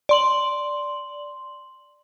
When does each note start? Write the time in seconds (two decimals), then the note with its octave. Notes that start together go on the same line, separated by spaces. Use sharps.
0.09 D5 C6 F#7